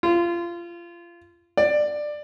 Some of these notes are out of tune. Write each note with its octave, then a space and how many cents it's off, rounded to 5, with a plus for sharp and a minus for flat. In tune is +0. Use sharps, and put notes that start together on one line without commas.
F4 -25
D5 +15